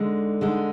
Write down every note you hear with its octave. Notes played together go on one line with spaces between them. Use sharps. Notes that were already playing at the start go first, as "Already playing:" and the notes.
Already playing: D3 G#3 D#4
D3 G#3 D#4